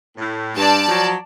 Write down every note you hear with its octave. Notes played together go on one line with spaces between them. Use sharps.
A2
G2 D5 A5
F3 F#3